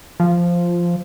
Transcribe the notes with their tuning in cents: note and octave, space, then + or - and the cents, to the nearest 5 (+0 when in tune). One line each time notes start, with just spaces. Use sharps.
F3 -5